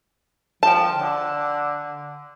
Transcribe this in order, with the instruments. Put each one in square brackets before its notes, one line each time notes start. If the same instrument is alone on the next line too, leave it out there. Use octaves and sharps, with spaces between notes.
[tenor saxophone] F3 [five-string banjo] G5 A5
[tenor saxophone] D3